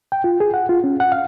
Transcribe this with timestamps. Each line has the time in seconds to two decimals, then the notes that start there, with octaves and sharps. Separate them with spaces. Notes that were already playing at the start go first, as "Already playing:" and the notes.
0.12 G5
0.24 F4
0.40 G#4
0.54 F#5
0.69 F4
0.84 C#4
1.00 F#5
1.12 F5